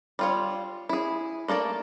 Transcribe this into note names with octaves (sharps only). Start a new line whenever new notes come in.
G3 F4 C#5
E4 G#4
A3 A#3 A4 D5